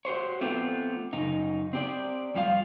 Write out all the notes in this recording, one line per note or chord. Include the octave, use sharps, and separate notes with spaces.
F#4 G4 C5 C#5
A3 B3 C4 F4 G4 B4
F#2 C#3 D#4
C4 G4 D5
F2 G3 F4 F#4 F5